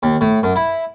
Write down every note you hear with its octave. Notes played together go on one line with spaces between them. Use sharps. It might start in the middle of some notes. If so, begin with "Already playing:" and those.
D#2
A2
F#2
E4